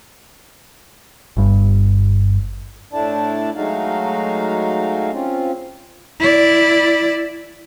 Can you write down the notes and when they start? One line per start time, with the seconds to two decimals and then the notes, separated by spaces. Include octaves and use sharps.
1.37 G1 G2
2.93 A2 A3 D4 E4 D5 A5
3.55 F#3 G#3 A3 D#4 F#4 F5
5.12 C4 C#4 F4
6.20 E4 D5